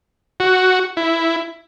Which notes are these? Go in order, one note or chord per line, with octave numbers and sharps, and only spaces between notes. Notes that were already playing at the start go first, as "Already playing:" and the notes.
F#4
E4